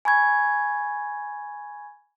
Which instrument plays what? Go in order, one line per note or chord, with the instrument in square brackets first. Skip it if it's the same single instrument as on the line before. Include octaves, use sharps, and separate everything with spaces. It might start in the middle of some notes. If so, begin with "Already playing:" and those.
[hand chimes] G#5 B5 C#6 G#6